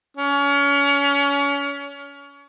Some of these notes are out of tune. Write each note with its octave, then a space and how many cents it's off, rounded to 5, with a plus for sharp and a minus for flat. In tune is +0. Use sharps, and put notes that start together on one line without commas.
C#4 +30